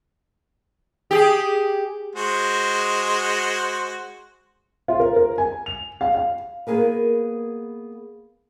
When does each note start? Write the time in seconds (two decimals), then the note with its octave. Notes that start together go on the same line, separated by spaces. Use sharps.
1.11 G4 G#4
2.15 G#3 F#4 C5
4.88 F4
5.00 A#4
5.16 A#4
5.38 G#5
5.66 F7
6.01 F5
6.15 F5
6.67 A#3 B3 C#4 G#4 A#4 B4